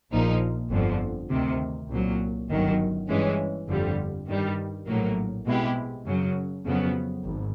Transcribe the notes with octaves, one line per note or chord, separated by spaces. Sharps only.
A#1 A#2 F3 A#3 D#4
G1 F2 D3 F3
D2 C3 D#3
C2 A#2 F#3
G1 F#2 D#3 F#3
G2 E3 G#3 C#4
G1 F2 D3 G3
G2 D#3 G3
A#1 A2 F#3 A#3
B2 G#3 C4 E4 G4
F#2 C#3 F#3
F2 C#3 F#3 B3
G#1